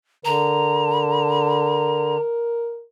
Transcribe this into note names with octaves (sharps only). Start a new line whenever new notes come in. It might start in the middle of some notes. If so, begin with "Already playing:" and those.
D3 A#4 A#5